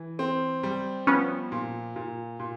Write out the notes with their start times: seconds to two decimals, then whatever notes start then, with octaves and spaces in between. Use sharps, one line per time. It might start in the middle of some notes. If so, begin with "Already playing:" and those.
Already playing: E3
0.19 C4
0.63 G3
1.07 F3 B3 C#4
1.52 A#2
1.96 A#2
2.39 A#2